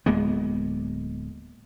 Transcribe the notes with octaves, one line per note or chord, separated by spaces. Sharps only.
D1 G#3 A#3 B3